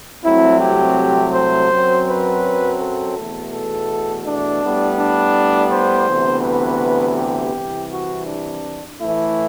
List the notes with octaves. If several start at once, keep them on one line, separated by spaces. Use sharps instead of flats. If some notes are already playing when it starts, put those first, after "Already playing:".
C2 C3 F#3 A3 C4 E4
G4
C5
F#2 F#3 C4
B4
A4
E2 B2 A3
A4
D4
A2 G3 B3
D4
C5
D2 C3 E3 B3
B4
G4
C2 C3 E3
F#4
D4
A2 E3 A3 E4